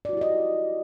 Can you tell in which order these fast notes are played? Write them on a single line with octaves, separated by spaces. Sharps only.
D5 F#4 E4 G4 D#5